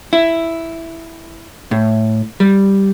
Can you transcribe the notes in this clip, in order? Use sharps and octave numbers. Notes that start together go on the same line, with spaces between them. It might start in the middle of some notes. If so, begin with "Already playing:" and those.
E4
A2
G3